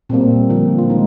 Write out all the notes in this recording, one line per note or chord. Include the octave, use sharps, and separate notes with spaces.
A#2 G3 A#3 C4
D3 F3 A#3
F4
D#3 G#3 D#4